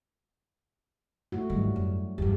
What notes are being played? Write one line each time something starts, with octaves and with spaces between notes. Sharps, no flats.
A3 E4 F#4
G#2 D#3 F#3 G3
F#2
E2 G2 G4